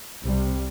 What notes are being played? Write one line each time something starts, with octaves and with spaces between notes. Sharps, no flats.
C2 C3 G3